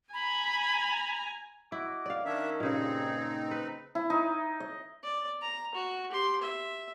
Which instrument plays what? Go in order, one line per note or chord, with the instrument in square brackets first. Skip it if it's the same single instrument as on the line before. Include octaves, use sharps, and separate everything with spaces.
[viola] G#5 A#5 [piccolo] B5
[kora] E4 [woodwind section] F#4 D#5 D6
[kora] D5 F5
[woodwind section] D#3 C#4 [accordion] D4 E5
[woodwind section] G2 G#4 [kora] A#2 C#3 [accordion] C4 D#4
[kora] B4
[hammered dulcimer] E4
D#4
D#5
[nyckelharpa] D5
A#5
F#4
G4 C6
E5